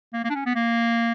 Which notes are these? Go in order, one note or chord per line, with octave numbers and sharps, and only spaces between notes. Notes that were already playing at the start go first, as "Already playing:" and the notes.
A#3
A#3
D4
C#4
B3
A#3